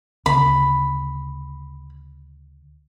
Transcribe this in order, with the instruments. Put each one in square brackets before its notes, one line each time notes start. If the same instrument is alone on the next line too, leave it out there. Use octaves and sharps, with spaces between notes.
[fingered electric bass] D2 C#3 [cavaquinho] B5